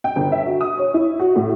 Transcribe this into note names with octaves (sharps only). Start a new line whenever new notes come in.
G5
G1
E5
F#4
D#6
C#5
E4
F#4
A2